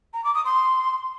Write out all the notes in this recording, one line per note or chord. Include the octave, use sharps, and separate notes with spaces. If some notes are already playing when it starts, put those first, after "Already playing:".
A#5
D6
D#6
C6